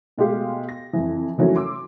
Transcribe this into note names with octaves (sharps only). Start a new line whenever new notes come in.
B2 G#3 A3 G4 F5
A#6
F2 E3
D#3 E3 F#3 A3 C#4
C6 D6 E6